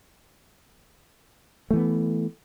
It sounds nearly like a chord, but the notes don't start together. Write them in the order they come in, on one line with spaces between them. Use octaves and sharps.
A3 E3 B3